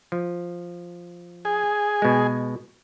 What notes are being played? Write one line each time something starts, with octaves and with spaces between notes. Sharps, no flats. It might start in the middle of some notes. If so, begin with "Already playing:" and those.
F3
G#4
B2 G#3